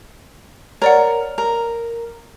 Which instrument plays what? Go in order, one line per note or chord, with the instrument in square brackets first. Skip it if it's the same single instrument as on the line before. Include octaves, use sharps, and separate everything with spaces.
[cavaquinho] A#4 [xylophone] C#5 D5 F#5
[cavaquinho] A#4